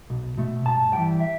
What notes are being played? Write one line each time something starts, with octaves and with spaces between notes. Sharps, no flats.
B1
B2 A3
G2 A5
E3 G3 G5
E5